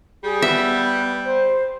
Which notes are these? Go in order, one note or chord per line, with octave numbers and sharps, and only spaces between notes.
G3 G#4
B3 E5
C5